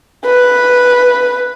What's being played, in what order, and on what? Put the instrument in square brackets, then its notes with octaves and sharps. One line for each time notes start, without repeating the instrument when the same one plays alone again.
[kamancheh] B4